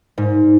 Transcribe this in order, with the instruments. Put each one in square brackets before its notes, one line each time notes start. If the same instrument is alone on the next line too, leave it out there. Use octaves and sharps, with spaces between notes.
[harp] G#2